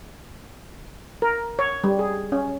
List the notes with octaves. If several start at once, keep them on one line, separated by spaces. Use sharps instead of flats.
A#4
C#5
G3
G#4
C#4